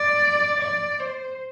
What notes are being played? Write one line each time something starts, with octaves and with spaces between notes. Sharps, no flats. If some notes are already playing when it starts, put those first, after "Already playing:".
Already playing: D5
D5
C5